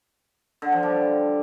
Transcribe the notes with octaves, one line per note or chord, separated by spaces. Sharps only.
D3
F3
G3